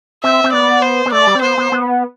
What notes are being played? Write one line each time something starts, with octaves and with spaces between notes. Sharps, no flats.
C4 E5
C4
B3 D5
C5
B3
A3 D5
G3
C4
B3 C5
B3
B3